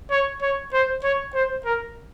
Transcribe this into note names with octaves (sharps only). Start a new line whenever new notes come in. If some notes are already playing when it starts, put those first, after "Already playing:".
C#5
C#5
C5
C#5
C5
A#4